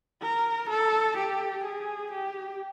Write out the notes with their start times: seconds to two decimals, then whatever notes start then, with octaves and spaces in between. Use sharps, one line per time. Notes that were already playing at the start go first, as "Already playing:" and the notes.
0.22 A#4
0.70 A4
1.18 G4
1.64 G#4
2.12 G4